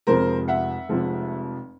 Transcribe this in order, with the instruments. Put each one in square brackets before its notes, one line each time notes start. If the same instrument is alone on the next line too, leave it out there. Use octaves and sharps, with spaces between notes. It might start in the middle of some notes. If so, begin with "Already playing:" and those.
[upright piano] F1 F2 C3 F3 G#3 A#4 C5
E5 F#5
F1 F2 C3 F3 G#3